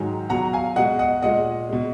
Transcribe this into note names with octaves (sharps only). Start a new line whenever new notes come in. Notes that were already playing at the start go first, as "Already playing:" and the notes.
Already playing: G#2 D#3 F#3 G#5
B2 F#3 F#5 A#5
F5 G#5
B2 G#3 D#5 F#5
D#5 F#5
A#2 G#3 D#5 F#5
B2 G#3